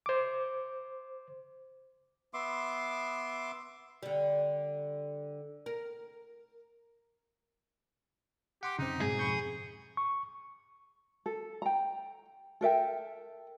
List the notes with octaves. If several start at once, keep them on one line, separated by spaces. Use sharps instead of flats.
C5 D6
B3 E5 C6 D6
D3 G3
A#4
G4 F#5 C6 D6
F#2 C#3 C4 D#4
G#2 B2 G#3 G#4
F2 B5 C#6 G6
C#6
A4
G5 A#5
A4 A#4 E5 G5